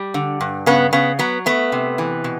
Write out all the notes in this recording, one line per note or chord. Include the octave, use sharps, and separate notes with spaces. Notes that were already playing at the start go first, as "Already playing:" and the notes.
Already playing: G3
D3
G2
C#3 B3
C#3 B3
F#3 B3
A3 B3
C3
E3
B2